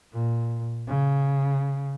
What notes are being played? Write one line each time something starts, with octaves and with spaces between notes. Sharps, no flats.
A#2
C#3